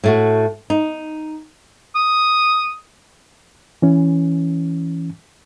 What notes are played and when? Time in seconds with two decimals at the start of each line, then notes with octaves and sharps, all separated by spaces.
0.04 A2 A3 F#4
0.70 D#4
1.95 D#6
3.82 E3 C#4